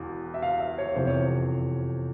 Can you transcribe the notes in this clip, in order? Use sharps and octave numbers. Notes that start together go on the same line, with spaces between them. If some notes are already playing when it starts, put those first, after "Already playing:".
Already playing: E1 E2
E5
F5
E5
C#5
F1 E2 C3 C5
C#5
C5